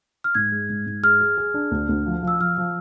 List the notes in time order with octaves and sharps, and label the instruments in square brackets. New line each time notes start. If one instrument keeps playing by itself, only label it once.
[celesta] F6
[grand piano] G#2 [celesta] G#6
[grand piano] G#3
G#2
G#2
[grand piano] G#4 [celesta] F6
[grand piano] G#4
G#4
D4
D2
D2
F3
[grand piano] F3 [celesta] E6
[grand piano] F3 [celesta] F6
[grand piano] F3